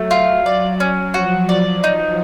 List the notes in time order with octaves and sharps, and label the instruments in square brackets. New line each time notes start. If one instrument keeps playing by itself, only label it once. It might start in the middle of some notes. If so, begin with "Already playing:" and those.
Already playing: [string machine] F#3 [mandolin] A3
[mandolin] F4
D5
C#4
[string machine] F3 [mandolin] F#4
[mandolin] D5
D#4